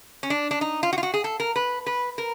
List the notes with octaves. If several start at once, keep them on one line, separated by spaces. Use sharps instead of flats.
C#4
D4
D4
D#4
F4
F#4
F4
F#4
G#4
A4
A#4
B4
B4
A#4